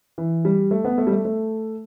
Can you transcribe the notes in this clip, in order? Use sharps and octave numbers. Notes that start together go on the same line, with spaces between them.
E3
G3
A3
B3
A3
G3
A3
A3